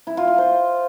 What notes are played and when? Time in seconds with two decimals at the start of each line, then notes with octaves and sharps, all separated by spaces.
0.07 E4
0.17 F4
0.28 F4
0.38 C5